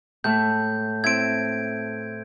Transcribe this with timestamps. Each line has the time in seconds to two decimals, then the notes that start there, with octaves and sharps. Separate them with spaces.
0.24 A2 A3 G6
1.04 C4 E4 G#6 D7